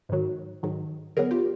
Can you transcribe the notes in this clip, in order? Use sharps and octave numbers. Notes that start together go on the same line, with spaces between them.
G#2 D#3 F#3
G#2 D#3 F#3
D3 F#3 B3 G#4 A#4
F4 G4